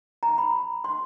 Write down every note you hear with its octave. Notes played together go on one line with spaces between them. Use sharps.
A#5
B5
C6